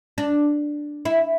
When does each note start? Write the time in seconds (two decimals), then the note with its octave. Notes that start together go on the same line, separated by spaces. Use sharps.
0.18 D4
1.05 E4